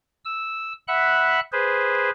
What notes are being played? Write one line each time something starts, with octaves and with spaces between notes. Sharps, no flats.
E6
E5 F#5 B5 F#6
G#4 B4 C5